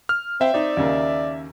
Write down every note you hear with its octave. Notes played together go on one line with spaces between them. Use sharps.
F6
C4 E5 F5 G5
C4 D#4 D5
D#2 C#3 A#3